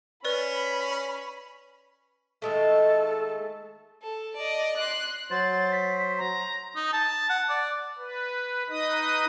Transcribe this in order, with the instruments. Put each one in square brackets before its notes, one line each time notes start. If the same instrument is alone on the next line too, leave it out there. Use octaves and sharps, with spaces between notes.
[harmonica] C#4 [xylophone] B4 D5 [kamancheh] B5
[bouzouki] D#3 G#3 A3 [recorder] A4
[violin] A4
D5 D#5
C6 F#6
[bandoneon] F#3 C5 [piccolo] A6
[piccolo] B6
A#5
[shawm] D#4
A5
F#5
D5
[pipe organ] B4
D#4 B4 D#5 D#6